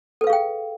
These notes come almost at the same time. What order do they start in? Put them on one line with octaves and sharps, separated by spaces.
A4 B4 F5 G#4 G5